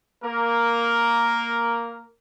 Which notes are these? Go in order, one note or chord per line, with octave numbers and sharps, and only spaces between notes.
A#3 A#4